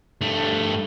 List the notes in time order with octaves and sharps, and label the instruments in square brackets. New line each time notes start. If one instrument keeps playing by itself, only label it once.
[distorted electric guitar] G2 A3